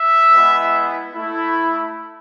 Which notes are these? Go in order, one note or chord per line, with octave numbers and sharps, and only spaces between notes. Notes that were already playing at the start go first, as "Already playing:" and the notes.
Already playing: E5
G#3 B3 E4
A3 E4